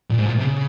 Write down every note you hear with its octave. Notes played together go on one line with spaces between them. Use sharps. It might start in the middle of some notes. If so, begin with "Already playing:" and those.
A#2
G#2
A#2
C3
C#3